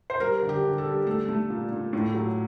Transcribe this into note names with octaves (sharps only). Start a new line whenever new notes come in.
C5
G3 A#4
D3
G4
D3
A4
G3
A3 A4
A3
A#2
A#2
A2
F#3